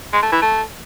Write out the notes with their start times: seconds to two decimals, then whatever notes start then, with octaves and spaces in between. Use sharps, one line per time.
0.13 G#3
0.23 A3
0.32 E3
0.42 A3